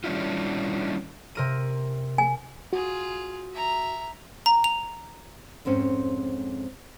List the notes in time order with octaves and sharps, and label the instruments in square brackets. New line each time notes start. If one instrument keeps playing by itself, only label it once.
[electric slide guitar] D#3 G3 C#4 D4 E4 F4
[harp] C3 A#4 D#7
[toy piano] G#5
[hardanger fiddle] F4 G#4 [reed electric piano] F#4
[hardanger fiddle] E5 A#5
[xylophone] A#5
F7
[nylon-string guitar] F2 G#2 C4 C#4